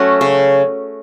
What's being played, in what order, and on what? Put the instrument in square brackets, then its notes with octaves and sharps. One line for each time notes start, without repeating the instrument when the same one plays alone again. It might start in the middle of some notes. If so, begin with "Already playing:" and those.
Already playing: [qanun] F#3 A3 C#4 F#4
C#3